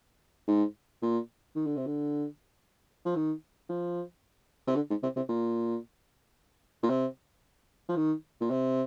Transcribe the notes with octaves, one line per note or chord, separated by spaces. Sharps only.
G#2
A#2
D#3
D3
C3
D3
F3
D#3
F3
C3
D3
G#2
C3
C3
A#2
A#2
C3
F3
D#3
A#2
C3